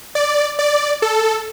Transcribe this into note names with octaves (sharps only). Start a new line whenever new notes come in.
D5
D5
A4